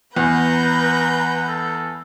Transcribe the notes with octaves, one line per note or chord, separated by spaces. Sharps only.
E2 B4 F#5 A#5 G6
A4